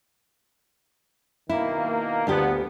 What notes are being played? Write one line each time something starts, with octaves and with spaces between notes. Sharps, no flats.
B2 D#3 A#3 E4
D2 D3 B3 F4 G4